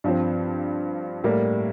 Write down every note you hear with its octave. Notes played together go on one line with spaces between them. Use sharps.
G2 F3 C4
A2 G3 A#3